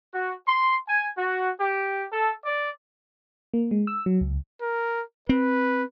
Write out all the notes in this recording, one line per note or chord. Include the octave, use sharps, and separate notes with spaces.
F#4
C6
G#5
F#4
G4
A4
D5
A#3
G#3
E6
F#3
C#2
A#4
C4 B4